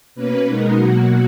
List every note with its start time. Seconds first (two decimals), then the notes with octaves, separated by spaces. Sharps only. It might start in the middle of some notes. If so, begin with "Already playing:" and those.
0.15 B2 A#3 C#4 B4
0.46 B2 G#3 B3 D#4 A#4
0.76 B2 F#3 A#3 F#4